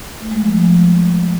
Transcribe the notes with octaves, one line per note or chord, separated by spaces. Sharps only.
A3
G#3
F3
F3